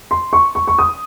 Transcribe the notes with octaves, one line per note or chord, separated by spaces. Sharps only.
C6
C#6
C#6
C#6
D#6